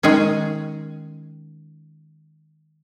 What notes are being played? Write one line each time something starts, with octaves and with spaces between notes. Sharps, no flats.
D#3 G#3 C#4 G#4